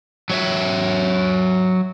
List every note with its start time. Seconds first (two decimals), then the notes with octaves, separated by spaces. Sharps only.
0.30 F#3 C#5 E5